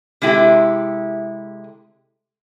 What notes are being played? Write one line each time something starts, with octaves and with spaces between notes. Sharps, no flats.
C3 G#3 E4 G4 A4